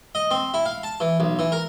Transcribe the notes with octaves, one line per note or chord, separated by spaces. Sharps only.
D#5
C4
E4
F5
A5
E3
B1
E3
A#4